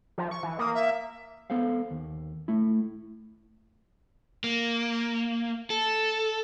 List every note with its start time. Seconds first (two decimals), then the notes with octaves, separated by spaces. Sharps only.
0.18 F3
0.31 C#6
0.43 E3
0.59 A#3 D#6
0.74 E5
1.50 B3 A4 C5 F5
1.90 D#2
2.48 A3 E4
4.44 A#3
5.70 A4